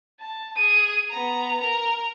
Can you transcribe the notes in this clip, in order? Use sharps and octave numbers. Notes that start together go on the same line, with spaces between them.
A5
G#4 D#7
B3 A#5
A#4 A#5